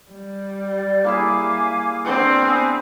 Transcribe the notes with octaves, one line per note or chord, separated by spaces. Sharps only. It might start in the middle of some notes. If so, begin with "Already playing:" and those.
G3
D5
A#3 E4 G#4 F5 G#5 D6
C4 D4 A#4 C#6
B3 G#5